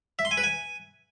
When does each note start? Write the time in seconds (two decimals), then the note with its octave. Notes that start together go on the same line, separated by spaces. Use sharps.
0.19 E5
0.25 C6
0.31 G#5
0.37 B4
0.44 G#5